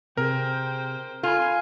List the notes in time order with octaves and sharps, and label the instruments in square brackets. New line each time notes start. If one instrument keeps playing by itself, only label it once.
[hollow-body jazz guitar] C3 G#4 [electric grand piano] A#4 [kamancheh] C5 G5
[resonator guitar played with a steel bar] F4 [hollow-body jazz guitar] A4 B5 [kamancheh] G#5